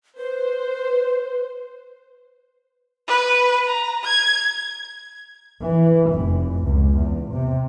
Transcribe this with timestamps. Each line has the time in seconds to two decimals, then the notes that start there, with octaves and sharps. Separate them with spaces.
0.17 B4 C5
3.08 B4
3.67 A#5
4.04 G#6
5.61 E3
6.12 F1
6.64 C#2
6.97 E2
7.32 C3